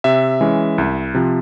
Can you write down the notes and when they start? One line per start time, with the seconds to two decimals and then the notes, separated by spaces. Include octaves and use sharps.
0.04 C3 E5
0.41 E3 G#3 C#4
0.78 C2
1.14 C3 F3